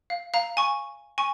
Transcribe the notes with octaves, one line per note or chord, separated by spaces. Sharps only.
F5
F5 A#5
G#5 C#6
G#5 C#6